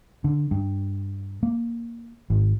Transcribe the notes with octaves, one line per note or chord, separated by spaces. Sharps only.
D3
G2
A#3
G#1